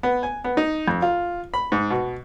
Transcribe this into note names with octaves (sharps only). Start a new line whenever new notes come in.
B3
G#5
B3
D#4
F2
F4
B5
G#2
B2